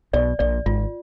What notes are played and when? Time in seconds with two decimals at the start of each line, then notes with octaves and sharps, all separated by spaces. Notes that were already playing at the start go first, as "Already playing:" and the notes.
0.13 B1 B2 D5
0.39 A#1 A#2 D5
0.66 G#1 G#2 F4